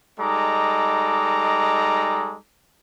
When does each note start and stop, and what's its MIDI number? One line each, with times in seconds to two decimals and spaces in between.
0.20 2.37 55
0.20 2.37 56
0.20 2.37 63
0.20 2.37 69
0.20 2.37 82
0.20 2.37 86